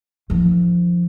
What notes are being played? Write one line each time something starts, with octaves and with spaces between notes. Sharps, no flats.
D#3 F3